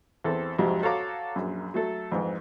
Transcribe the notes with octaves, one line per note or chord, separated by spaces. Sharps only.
E2 C4 A4
F2 G#2 C3 F#3
F#4 A4 C#5 F5 A#5 D6
A#1 F#2
F#3 A3 A4
F2 G#2 E3